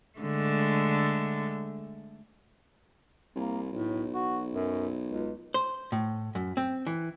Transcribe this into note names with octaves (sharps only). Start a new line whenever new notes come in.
D3 G#3 A3
C2 A#3
B1 A2
F#4
F#2
C#2
C5
A2
F#2
C4
E3